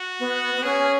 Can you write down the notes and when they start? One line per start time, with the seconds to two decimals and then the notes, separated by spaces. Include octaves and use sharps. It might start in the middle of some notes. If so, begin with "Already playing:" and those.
Already playing: F#4
0.19 B3
0.55 B3
0.63 C#4 G#4